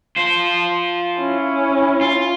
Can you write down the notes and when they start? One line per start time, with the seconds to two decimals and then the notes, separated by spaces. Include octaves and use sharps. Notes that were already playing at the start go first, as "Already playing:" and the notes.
0.16 F4 C5
1.19 C#4 E4
2.01 F4